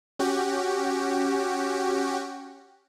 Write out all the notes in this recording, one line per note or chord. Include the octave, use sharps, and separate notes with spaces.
C#4 F#4 G4